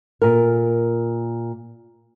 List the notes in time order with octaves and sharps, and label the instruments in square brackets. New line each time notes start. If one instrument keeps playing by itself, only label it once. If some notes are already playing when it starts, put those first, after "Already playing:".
[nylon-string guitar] A#2 A#4